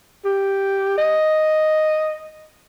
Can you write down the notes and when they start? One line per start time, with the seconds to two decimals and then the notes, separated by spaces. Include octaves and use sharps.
0.25 G4
0.98 D#5